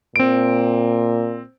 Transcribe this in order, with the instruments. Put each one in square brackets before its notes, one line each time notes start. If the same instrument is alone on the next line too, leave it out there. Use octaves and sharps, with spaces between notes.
[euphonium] A#2 [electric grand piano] C4 D7